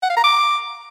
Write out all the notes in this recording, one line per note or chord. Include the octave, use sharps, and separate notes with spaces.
F#5
F5
A#5
D6